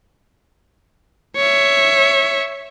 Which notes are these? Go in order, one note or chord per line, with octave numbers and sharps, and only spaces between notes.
C#5 E5